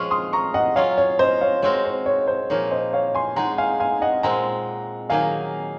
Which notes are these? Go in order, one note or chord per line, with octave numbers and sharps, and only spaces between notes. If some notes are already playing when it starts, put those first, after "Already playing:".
Already playing: F3 G#3 C#4 G#4 C#6 F6
C6 D#6
A#5 C#6
D#5 F#5
F#3 C#4 F4 C#5 F5
C#5
C5 D#5
C#5 F5
G#3 C4 F#4 A#4 C#5
C5
C#5
C5
A#2 F3 A#3 D#4 G#4 C#5
C5 D#5
C#5 F5
G#5 C6
G#3 D#4 G#4 F#5 A#5
F5 G#5
F5 G#5
D#5 F#5
A#2 G#3 C4 F#5 A#5
D#3 F#3 A#3 D#4 G#4 F5 G#5